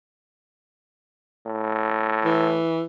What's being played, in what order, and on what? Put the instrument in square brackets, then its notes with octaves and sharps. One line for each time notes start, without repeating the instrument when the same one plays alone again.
[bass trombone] A2
[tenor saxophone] E3